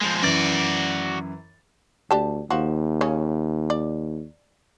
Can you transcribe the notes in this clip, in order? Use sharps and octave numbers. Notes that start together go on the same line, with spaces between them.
F3 G#3
F#2 E3 F#4 D5 A6
D2 D4 G4 A5
D#2 F3 F#4
C#3 C#4
D5